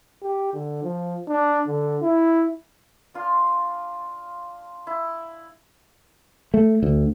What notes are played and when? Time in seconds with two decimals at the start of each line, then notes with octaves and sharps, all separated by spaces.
0.22 G4
0.54 D3
0.83 F3
1.28 D4
1.68 D3
2.02 E4
3.14 D4 F4 C6
4.87 E4
6.54 A3
6.83 D2